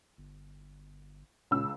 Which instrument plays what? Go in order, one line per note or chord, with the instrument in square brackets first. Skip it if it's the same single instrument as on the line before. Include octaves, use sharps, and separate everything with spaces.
[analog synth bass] G1
[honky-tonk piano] C#2 C#3 E6 [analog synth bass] A#2